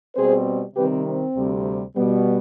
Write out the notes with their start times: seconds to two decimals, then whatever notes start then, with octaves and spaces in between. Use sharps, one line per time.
0.15 B2 G3 C4 G#4 C5
0.75 C3 D#3 G3 C4 G4 B4
1.05 C4
1.35 D2 C3 G3
1.95 B2 G3 B3